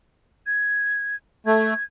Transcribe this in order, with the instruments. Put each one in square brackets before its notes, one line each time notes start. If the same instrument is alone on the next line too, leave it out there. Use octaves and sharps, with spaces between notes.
[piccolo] G#6
[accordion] A3 [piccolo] G#6